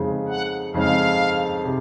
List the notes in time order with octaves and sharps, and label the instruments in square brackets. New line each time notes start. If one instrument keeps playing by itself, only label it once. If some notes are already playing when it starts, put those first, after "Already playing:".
Already playing: [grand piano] F2 C#3 G#3 D#4
[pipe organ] F#5
[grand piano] F2 C#3 G#3 D#4 [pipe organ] F5
[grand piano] C3